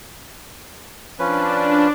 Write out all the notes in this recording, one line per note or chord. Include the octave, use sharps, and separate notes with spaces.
F3 C#4 D4 B4